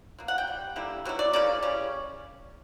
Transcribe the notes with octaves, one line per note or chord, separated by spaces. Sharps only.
B2 A#3
F#5
G5
B2 G3
D3 G3 A#3 E4
B2 F#3 E4
D5
C#3 E3 A#3 C#4 D5
C#3 G3 C#4